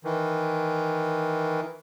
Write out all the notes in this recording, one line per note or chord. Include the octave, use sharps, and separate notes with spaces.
D#3 E3